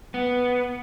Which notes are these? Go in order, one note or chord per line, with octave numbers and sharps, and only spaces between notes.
B3